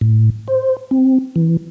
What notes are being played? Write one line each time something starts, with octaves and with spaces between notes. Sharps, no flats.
A2
C5
C4
E3